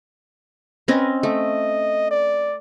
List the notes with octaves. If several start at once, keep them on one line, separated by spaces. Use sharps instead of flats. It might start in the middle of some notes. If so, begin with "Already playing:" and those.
C4 C#4 B4 D#5
A3 D#5
D5